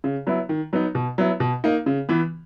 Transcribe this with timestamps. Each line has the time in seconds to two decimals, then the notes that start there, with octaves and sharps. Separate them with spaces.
0.04 C#3
0.27 F#3 B3 E4
0.49 D#3
0.73 F#3 B3 D#4
0.95 B2
1.18 F#3 B3 E4
1.40 B2
1.64 A#3 D#4
1.86 C#3
2.09 E3 B3